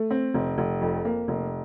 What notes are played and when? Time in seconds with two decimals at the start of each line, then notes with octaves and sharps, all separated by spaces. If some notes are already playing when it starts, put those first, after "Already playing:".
Already playing: A3
0.11 C4
0.34 F1
0.58 F1
0.81 F2
1.05 A#3
1.28 F1